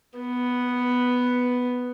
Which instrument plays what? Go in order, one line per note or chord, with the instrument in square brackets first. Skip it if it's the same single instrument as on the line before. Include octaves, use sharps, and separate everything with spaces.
[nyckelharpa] B3